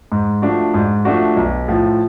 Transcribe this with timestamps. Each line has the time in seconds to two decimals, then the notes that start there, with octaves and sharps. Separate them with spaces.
0.12 G#2
0.42 F3 A3 D4 F#4
0.74 G#2
1.05 F3 A3 D4 F#4
1.37 B1
1.68 A2 F3